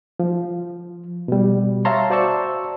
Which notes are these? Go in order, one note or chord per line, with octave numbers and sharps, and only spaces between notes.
F3
B2 G3
C#5 E5 F5 A5 A#5 C6
F#4 C5 D5 A5 C#6 E6